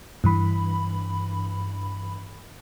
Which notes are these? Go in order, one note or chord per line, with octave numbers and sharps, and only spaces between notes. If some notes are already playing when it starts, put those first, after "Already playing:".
G2 E3 B5